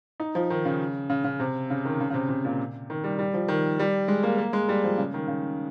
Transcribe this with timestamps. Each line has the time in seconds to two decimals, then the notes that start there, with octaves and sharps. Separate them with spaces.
0.20 D#4
0.35 F3
0.50 D#3
0.65 C#3
1.10 C#3
1.24 C#3
1.40 C3
1.70 C#3
1.85 D#3
2.00 C#3
2.10 C#3
2.14 C3
2.29 C3
2.45 A#2
2.90 D#3
3.04 G3
3.19 G3
3.34 F3
3.48 D#3
3.79 G3
4.08 G#3
4.23 A#3
4.38 A#3
4.53 G#3
4.69 G3
4.83 F3
4.98 C#3
5.14 D#3
5.28 C#3